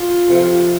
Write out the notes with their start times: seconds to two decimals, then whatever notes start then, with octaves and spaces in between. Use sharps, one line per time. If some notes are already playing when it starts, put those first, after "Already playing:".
Already playing: F4
0.28 F2 C3 F3